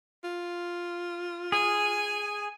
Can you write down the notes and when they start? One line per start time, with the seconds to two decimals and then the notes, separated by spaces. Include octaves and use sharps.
0.24 F4
1.52 G#4 G#5